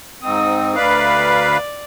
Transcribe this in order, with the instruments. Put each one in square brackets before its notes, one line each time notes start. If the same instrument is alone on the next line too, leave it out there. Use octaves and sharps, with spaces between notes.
[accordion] G#2 C4 [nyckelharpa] D#4 D#6
[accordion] D2 B4 F5 [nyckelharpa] D5